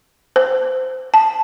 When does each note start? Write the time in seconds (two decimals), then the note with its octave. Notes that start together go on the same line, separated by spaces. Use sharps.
0.36 C5
1.14 A5